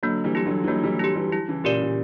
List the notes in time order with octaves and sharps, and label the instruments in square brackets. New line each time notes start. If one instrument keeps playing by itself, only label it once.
[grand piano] D3 F#3 [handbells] A#3
[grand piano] E3 G3
[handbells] E4 G4
[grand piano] D3 F#3
E3
[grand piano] D3 F#3 [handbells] A#3
[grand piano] E3 G3
[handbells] E4 G4
[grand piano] E3 G3
[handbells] E4
[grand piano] C#3 E3
[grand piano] A#2 C#3 [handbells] G4 A#4 D5
[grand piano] A#2